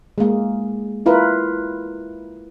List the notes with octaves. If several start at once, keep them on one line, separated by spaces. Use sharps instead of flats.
G#3 A#3
E4 F4 A#4 B4